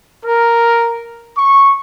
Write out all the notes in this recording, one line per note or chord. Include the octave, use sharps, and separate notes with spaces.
A#4
C#6